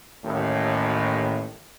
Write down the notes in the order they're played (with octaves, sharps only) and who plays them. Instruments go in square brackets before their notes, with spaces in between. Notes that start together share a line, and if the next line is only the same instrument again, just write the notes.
[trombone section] A1 D#2 A2